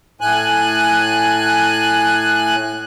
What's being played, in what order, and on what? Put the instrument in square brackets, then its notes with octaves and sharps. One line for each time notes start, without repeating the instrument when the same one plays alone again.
[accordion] A2 G#5 F#6